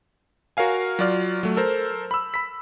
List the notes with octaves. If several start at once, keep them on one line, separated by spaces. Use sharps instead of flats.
F#4 A#4 C#5 F5 G#5
F#3 F4 D5 F6
F#3 A3
A4 A#4 C5
B5 E6
B5 B6